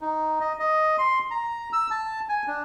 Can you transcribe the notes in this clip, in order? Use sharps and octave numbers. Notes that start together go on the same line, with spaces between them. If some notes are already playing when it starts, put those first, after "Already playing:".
D#4
D#5
D#5
C6
A#5
E6
A5
G#5
D4